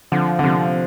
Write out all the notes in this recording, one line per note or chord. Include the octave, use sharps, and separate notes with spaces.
D3 F3
D3
C3 F3